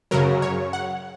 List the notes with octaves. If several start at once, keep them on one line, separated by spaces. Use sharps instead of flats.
F#2 C#3 F#3 A#4
C#5
F#5